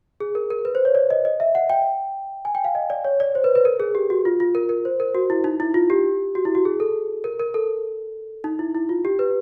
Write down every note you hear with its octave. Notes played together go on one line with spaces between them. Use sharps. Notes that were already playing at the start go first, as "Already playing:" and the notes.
G#4
A#4
A#4
B4
C5
C#5
D5
D#5
D#5
E5
F#5
G5
G#5
G5
F5
D#5
D5
C#5
D5
C5
B4
B4
A#4
G#4
G4
F#4
F4
F4
A#4
A#4
C5
A#4
F#4
E4
D#4
E4
F4
G4
F#4
E4
F#4
G#4
A4
A#4
A#4
A4
D#4
E4
E4
F4
G4
B4